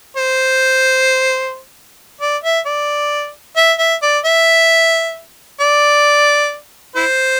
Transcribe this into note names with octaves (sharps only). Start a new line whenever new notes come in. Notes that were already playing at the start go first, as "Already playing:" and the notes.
C5
D5
E5
D5
E5
E5
D5
E5
D5
E4 C5